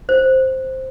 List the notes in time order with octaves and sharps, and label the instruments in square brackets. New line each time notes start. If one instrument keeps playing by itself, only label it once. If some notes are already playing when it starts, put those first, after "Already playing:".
[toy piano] C5